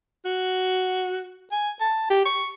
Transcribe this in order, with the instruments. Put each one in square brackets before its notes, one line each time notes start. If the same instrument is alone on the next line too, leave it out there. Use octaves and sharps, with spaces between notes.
[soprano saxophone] F#4
G#5
A5
G4
C#6